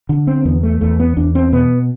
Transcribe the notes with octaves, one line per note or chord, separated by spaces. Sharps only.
D3
C4
E2 B3
A3
E2 A3
B3
E2 D4
C4
B2 B3